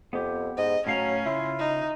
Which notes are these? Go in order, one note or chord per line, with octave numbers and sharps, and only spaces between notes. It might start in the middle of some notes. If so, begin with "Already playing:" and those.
F2 B3 G4
G#2 D#5
A2 F#3 C#4 F5 A#5
C#3 E4 F4
D#4